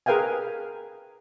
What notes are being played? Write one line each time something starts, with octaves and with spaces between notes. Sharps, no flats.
G#4 A#4 B4 F5 G5 G#5